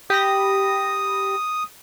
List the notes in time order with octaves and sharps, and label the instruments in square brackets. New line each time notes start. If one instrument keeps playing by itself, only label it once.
[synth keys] G4 B5 A#6 [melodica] D#6